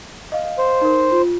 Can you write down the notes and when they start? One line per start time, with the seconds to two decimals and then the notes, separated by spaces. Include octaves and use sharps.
0.32 D#5 F5
0.59 C5
0.81 D#4 A#4
1.11 F4